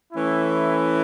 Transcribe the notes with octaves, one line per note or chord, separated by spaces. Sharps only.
E3 A3 C#4 E4